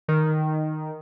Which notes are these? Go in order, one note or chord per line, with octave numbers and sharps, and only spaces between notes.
D#3